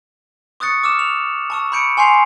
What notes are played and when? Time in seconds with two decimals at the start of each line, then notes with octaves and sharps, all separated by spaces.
0.60 C#6 D#6 F#6 A6 C#7
0.83 D6 E6 F6 E7
0.99 F7
1.50 A5 C#6 E6
1.72 B5 C#6 G6 C#7 D7
1.97 G#5 C6 C#6 G6 C7 F7